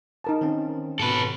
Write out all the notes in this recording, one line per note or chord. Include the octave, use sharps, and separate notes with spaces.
D#4 A#4 A5
D#3 C4 C#4
G#2 B2 A4 B4